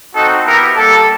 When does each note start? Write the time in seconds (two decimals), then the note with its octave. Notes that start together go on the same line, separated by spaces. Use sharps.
0.15 C4 D#4 F#4 A4
0.46 B3 E4 G4 A#4
0.77 G3 A#3 D4 A4